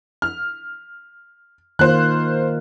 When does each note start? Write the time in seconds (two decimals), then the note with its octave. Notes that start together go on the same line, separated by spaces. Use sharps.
0.22 F6
1.79 D#3 A#3 F4 C5 F#6